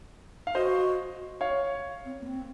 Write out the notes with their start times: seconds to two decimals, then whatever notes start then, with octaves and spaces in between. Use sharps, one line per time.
0.47 F5
0.55 F#4 C5 D#5
1.41 C#5 F5
2.05 C4
2.21 A#3
2.27 C4